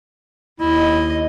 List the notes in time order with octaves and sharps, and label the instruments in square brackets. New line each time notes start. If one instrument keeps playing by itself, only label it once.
[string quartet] D#2 D#5 [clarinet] E4